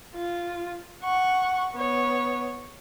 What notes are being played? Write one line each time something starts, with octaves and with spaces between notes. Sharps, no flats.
F4
F#5 C#6
B3 C#5